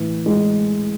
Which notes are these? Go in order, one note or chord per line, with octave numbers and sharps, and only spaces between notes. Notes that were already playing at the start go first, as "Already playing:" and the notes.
Already playing: A2 E3
G#3